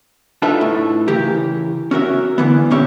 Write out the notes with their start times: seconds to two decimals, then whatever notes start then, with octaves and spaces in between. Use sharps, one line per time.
0.42 D4 D#4 F4 A4 B4 E5
0.61 A2
1.08 C#3 E3 G4 A#4
1.91 C#4 F#4 A#4 E5
2.38 D3 E3 B3
2.71 A#2 G#3 C#4 G4 C#5 E5